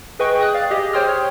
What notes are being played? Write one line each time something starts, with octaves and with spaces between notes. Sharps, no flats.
G#4 B4 D#5 G5 C#6
G5 D#6 F#6
D5 F5 A6
G4 G#4 D#5
C5 C#5 G5 C6 D#6 F6
C#5